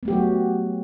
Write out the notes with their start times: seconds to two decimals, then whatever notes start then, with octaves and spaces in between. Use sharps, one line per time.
0.03 B3
0.05 A3
0.08 G4
0.10 F#3
0.13 F#4